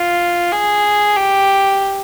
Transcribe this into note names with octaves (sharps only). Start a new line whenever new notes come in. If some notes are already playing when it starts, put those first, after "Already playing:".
Already playing: F4
G#4
G4